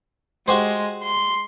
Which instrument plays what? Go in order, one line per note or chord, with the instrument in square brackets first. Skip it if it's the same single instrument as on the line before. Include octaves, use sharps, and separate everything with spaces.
[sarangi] G#3 [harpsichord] F#4 G4 C5
[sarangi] C6